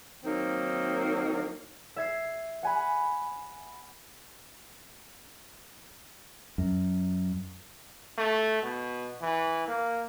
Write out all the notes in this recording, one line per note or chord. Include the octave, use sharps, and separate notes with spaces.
D#3 F#3 A#3 C4 D#4
E5 G#6 C7
F#5 G#5 B5
F#2
A3
B2
E3
A#3